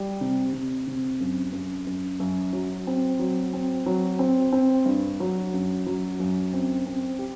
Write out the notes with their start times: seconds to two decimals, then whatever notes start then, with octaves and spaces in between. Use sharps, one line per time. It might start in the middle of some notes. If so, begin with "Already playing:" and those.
Already playing: G3
0.21 C3
0.53 C3
0.87 C3
1.21 F#2
1.53 F#2
1.87 F#2
2.20 F#2
2.53 F#3
2.87 C4
3.19 F#3
3.53 C4
3.86 F#3
4.19 C4
4.53 C4
4.86 G2
5.20 F#3
5.54 F#2
5.86 F#3
6.20 F#2
6.53 C4
6.87 C4
7.19 G4